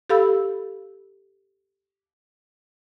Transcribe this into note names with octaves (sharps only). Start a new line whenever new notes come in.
G4 A4 F5 B5 E6